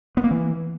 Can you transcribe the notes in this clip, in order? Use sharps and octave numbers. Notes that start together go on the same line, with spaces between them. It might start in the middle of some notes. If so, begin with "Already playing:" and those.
B3
A#3
E3